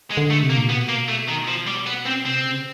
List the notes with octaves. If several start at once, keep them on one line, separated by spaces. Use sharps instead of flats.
G#3
D3
A3
C3
A#3
A#2
B2 B3
A#3
A3
D#3
F3
G3
B3
C4
C3 C4
C#3